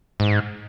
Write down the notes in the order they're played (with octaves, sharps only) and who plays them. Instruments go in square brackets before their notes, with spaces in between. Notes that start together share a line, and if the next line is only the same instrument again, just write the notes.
[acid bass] G#2